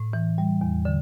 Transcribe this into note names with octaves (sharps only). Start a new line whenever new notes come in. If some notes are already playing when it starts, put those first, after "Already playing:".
Already playing: A2
E3
G3
E2
D3